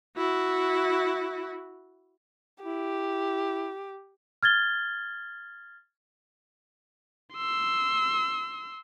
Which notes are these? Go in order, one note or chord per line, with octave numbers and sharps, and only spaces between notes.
E4 F#4
E4 G4
F6 G#6 A6 G7
C6 E6